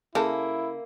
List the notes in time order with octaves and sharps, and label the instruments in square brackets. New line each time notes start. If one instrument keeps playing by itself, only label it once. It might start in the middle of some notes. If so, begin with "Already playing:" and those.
[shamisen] C#3 A4 [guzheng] A#3 [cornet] E4